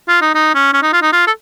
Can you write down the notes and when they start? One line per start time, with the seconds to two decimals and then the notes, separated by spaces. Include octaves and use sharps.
0.08 F4
0.21 D#4
0.34 D#4
0.54 C#4
0.73 C#4
0.83 D#4
0.93 F4
1.02 D#4
1.12 F4
1.27 A4